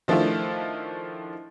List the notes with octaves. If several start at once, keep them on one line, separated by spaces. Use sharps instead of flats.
D#3 F3 A3 D4 E4 F4